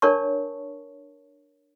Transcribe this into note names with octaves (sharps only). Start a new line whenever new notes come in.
D4 A#4 C#5 A5 C#6